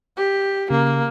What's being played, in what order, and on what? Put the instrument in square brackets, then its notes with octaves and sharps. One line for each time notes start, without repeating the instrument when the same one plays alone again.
[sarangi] G4
[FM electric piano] C#3 [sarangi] A#3